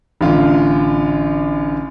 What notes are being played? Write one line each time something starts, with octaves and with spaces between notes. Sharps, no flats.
A1 D3 F4